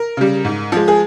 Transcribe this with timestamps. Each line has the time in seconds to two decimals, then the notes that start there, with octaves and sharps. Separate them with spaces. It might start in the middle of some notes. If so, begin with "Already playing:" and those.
Already playing: A#4
0.17 C#3 G3
0.45 G#2
0.72 F3 G#3
0.88 G#4